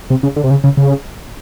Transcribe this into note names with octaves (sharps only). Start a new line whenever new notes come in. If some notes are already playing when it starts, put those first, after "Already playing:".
C3
C#3
D3
C3
C#3
C#3
C#3